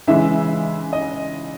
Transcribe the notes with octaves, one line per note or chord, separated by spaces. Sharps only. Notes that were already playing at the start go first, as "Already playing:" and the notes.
C#3 E3 G#3 E5
D#5